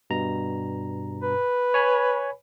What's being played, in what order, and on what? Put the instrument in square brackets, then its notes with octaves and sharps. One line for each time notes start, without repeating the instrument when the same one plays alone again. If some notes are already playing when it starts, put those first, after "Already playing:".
[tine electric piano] G2 B2 A#5
[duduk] B4
[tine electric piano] C#5 G#5 B5